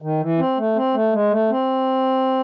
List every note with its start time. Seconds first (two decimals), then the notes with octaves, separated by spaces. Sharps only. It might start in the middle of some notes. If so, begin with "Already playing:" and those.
0.02 D#3
0.21 E3
0.39 C4
0.58 A3
0.76 C4
0.94 A3
1.13 G#3
1.31 A3
1.50 C4